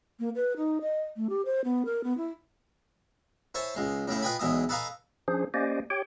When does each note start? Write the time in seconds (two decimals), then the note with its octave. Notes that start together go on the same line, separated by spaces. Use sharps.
0.19 A#3
0.36 B4
0.57 D#4
0.81 D#5
1.16 A3
1.30 G4
1.45 C5
1.65 B3
1.85 A#4
2.04 B3
2.17 E4
3.55 E4 C5 C#5 G#5 A5
3.74 C#2 G#3 C6
4.07 A2 C#3 A3 E4
4.22 F4 B4 D#5 G5 G#5 B5
4.39 B1 E2 G#3 E4 D#6
4.69 A4 B4 D#5 F5 G#5 A#5
5.28 F3 C#4 D4 G#4 C5
5.54 A#3 C#4 G4 C5 D5 D#5
5.90 G4 C#5 G5